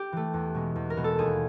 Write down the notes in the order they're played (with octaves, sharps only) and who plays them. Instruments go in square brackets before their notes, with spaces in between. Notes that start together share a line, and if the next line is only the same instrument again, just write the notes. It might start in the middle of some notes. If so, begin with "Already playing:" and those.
Already playing: [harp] G4
E3 A3
E2
B2 G#3 B3
E2
A#4
B2 G#3 B3
A4
D#2 G#4